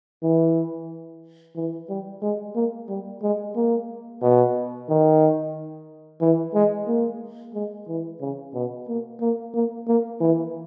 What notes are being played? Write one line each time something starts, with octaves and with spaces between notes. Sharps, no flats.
E3
E3
G3
G#3
A#3
G3
G#3
A#3
B2
D#3
E3
G#3
A#3
G#3
E3
C#3
B2
A#3
A#3
A#3
A#3
E3